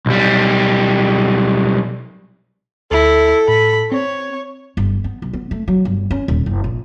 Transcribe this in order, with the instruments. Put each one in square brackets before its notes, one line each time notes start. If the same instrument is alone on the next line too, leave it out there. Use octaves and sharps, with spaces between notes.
[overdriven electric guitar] B1 G3
[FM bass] D2 [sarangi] E4 [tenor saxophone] A4
[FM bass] A2 [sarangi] B5
[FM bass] C4 [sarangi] C#5
[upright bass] G1
B3
B1
B3
A3
F#3
G1
C#4
D#1
F#1
A#1